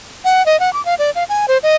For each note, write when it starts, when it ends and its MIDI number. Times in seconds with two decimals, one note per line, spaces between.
0.25 0.44 78
0.46 0.59 75
0.60 0.73 78
0.73 0.84 86
0.85 0.95 77
0.99 1.11 74
1.15 1.24 77
1.29 1.46 80
1.48 1.58 72
1.63 1.76 75